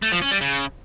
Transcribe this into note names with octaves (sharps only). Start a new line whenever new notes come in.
A3
F3
C#4
G3
C#3